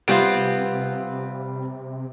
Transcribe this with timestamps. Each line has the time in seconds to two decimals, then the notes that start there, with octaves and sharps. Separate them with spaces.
0.08 C3 G3 B3 C4 F4 D7